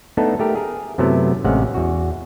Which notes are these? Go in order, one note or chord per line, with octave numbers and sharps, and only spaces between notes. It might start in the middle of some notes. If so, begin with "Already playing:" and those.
A3 B3 D4 D#4 A4
A3 G4 A#4
G#4 A#4
F#2 C3 F#3 A3 B3 E4
A1 C3 G#3 C#4 F5 F#5
E2 F#4